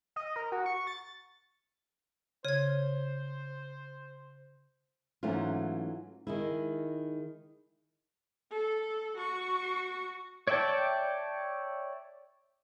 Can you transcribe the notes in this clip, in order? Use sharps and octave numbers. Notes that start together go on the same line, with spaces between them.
D#5
A#4
F#4
C#6
A6
C#3 C5 C#5 G#6
G#2 E3 F#3 A3 C#4 F4
D#3 G#3 E4
A4
F#4 C#6
C#5 D5 E5 G5 A5